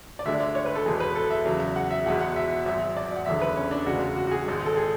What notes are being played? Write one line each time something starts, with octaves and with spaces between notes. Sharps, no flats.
D5
D2 D3 G#3 E5
D5
C#5
B4
A4
E2 B2 G#3 G#4
B4
A4
E5
E2 C#3 F#3
F#5
E5
E2 B2 G#3 F#5
F#5
E5
G#1 G#2 F#3 E5
D5
F#5
F#1 E2 D3 E5
B4
C#4
D4
E1 D2 C#3 G#3 F#4
F#4
F#4
G#4
G#1 G#2 G#3
A4
G#4